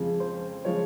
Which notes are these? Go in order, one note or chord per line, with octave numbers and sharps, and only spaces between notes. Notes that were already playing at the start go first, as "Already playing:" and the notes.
Already playing: F2 C#3 F3 G#3
C5
C#3 F3 G#3 C#5